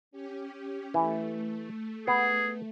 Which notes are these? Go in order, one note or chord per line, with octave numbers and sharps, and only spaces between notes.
C#4 G4
E3 A3
B3 G#4